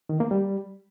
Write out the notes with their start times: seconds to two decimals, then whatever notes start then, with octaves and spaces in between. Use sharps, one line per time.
0.09 D#3
0.20 A#3
0.31 G3